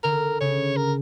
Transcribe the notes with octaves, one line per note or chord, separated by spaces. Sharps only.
D3 A#4
C#3 C#5
A#4